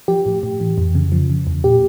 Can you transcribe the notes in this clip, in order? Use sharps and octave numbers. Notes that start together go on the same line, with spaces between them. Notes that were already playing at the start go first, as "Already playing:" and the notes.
F3 G4
A2
A2
E3
F2
C#3
F3
C#3
E2
A#2 G4